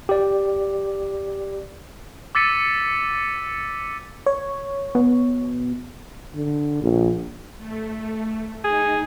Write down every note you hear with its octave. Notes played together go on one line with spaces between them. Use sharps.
G4 D5
D6 E6 A6 B6 C#7 D#7
C#5
B2
D3
A#1
A3
D#4 G#4